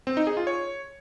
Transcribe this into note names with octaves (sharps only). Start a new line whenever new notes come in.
C4
D#4
G#4
F4
C#5